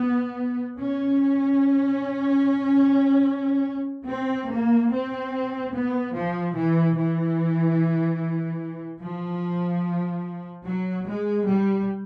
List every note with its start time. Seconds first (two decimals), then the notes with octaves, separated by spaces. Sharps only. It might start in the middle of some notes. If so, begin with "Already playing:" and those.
Already playing: B3
0.77 C#4
4.06 C4
4.48 A#3
4.89 C4
5.71 B3
6.12 F3
6.54 E3
6.95 E3
9.01 F3
10.65 F#3
11.07 G#3
11.47 G3